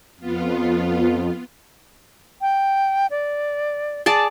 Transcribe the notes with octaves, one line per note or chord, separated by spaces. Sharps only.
F2 B3 F4
G5
D5
G#4 D5 A5